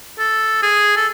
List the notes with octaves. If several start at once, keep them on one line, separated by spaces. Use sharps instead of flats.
A4
G#4
A4